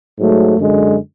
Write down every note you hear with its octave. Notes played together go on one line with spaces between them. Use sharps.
G#2 F#3 A3
F#2 D3 G#3